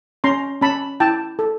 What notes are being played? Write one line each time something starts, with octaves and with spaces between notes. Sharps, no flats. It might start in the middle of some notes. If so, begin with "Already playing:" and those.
C#4 A#5 C6
C#4 A5 B5
E4 G5 A5
A4